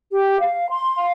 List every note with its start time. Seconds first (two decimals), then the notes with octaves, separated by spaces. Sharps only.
0.11 G4
0.40 F5
0.68 C6
0.96 F5